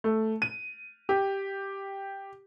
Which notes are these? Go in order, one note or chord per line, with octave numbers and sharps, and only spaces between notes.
A3
D#7
G4